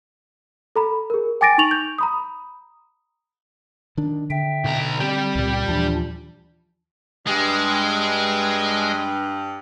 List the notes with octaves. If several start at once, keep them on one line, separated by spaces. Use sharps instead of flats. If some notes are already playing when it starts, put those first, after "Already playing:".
A4 A#5 B5
G#4 A#4
G5 G#5 D6 A6 A#6 D7
D#4 C#6 F7 F#7
G6
A#5 B5 D#6
D#3 D4
D3 E5 G5
B1 A#5
G3 C4 G4 G5
C#2 A#2
D#2 A#2 E3 F3 D4
G2 G#3